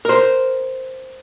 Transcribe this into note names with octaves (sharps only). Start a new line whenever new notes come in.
A#4 C5